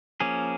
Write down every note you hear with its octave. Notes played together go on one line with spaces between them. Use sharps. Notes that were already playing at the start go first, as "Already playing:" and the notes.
F3 A#3 C#4 G#4